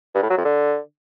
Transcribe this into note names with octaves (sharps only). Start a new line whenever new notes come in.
G2
A2
F#3
F2
D3